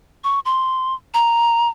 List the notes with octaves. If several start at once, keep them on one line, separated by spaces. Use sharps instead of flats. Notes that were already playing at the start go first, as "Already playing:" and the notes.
C#6
C6
A#5